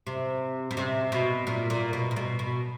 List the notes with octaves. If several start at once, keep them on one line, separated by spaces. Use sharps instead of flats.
C3
B2
C3
B2
A#2
A#2
B2
A#2
B2
B2